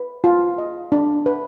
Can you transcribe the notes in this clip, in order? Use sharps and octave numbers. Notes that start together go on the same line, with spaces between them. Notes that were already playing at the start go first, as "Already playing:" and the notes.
Already playing: B4
F4
D#5
D4
B4